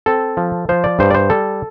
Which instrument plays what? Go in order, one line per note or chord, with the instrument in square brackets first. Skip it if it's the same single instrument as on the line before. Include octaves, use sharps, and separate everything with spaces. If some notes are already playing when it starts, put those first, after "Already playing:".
[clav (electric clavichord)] C4 A4
F3
F3 C5
D5
G2 C5
D5
C5
G3 A4